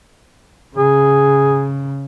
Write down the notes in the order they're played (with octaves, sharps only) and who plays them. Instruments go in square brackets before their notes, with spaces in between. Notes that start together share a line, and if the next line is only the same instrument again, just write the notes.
[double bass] C#3 [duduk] G#4